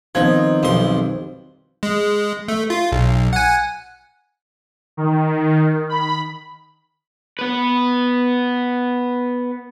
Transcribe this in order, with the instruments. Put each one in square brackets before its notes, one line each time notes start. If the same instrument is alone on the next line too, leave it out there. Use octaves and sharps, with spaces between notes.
[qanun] D#3 B3 D#4 [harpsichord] F3 [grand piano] C4 G#6
[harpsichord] B1 F2 C6 [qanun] G3
[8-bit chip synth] G#3
A3
F4
B1
F#5 G#5
[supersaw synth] D#3
B5
[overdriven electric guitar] B3 B4